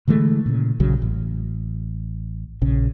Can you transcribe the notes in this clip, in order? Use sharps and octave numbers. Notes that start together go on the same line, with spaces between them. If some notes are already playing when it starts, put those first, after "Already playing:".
D3 E3 G#3 A3
A#2 C#3
A#1 C#3 F#3
A1
A#1 C#3